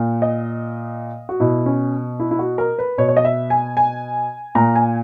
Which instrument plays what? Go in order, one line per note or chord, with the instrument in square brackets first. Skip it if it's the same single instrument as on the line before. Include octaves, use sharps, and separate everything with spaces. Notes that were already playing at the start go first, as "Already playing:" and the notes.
Already playing: [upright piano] A#2
D#5
F#4
B2 E4
C#4
E4
E4
F#4
A#4
B4
B2 C#5
C#5
D#5
E5
G#5
G#5
A#2 A#5
G#5